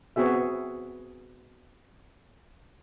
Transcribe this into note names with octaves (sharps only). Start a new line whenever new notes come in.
B3 C4 F#4 G#4 E5